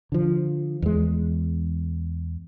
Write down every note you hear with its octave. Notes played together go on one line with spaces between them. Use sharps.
D3 F3
E2 G#3